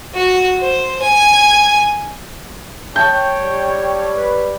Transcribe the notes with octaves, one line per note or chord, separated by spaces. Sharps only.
F#4
C5
G#5
C#5 G5 A5 G6
G3
B4